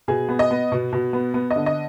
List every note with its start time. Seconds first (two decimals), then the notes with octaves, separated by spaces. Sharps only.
0.08 B2 G#4
0.29 B3
0.39 D#5
0.51 B3
0.72 B2
0.93 B2
1.13 B3
1.34 B3
1.51 D#5
1.56 D3
1.66 D#5